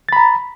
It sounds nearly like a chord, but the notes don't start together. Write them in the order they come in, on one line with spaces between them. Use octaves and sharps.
A6 B5 A#5